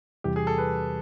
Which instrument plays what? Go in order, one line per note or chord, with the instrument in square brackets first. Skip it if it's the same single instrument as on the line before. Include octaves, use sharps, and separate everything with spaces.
[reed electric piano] E2 C3 E3 G3 [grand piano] G4
[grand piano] G#4
A4
B4